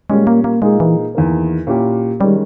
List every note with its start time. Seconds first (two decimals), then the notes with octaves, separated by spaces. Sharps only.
0.10 A#2 G3 G#3 C#4
0.27 A#3
0.44 A#3
0.62 A#2 G#3 A#3 D#4 G#4
0.80 E3
1.15 E2 D#3 A#3
1.67 A#2 A#3 C#4 E4 G4
2.20 D#3 G3 G#3 C#4